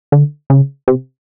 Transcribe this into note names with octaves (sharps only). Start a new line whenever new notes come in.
D3
C#3
C3